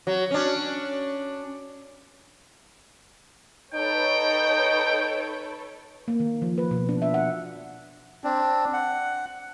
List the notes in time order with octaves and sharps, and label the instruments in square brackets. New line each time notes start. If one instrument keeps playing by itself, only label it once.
[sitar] F#3
C#4 D4
[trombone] D#4 [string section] A4 B4 C#5 [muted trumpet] G5
[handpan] A#3
D#3
F3
B4
B2
D4
E5
F#5
[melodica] C4 D4
F#5